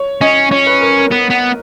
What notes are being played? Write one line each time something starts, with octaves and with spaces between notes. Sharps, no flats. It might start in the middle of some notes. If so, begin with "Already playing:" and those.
Already playing: C#5
C#4 D#5
C#4 C#5
B4
A#4
A#4
B3
B3